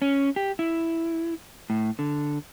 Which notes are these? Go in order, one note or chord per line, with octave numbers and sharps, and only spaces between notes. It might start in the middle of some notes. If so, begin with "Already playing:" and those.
C#4
G4
E4
A2
D3